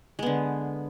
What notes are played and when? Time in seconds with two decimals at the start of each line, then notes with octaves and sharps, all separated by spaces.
0.19 G#3
0.23 B3
0.26 D3